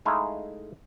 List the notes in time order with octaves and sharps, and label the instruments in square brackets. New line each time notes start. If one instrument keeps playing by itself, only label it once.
[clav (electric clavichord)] G#3 A3 D#4 E4 F5 G#5